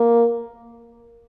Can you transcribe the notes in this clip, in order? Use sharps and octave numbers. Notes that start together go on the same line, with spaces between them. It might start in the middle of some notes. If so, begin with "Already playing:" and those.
Already playing: A#3